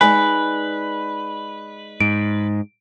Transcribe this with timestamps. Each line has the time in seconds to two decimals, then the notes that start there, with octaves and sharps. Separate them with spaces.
0.01 G#3 D#4 B4 D5 G#5
2.01 G#2 D7